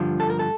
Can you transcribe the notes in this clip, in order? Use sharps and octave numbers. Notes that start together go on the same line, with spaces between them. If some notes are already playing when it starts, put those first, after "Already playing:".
Already playing: G2 D3 F3
A4
A#4
A4